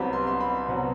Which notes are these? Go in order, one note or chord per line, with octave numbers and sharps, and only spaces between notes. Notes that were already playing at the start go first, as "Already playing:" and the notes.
Already playing: C2 C3 F#3 B3 B5
C6
C6
B5
C2 C3 F#3 B3